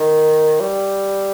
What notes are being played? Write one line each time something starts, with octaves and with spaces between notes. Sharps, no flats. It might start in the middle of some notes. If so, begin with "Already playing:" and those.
Already playing: D#3
G3